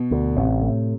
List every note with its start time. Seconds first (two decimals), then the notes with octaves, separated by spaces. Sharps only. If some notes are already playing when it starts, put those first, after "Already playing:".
Already playing: B2
0.11 D2
0.37 A1 C3
0.61 A2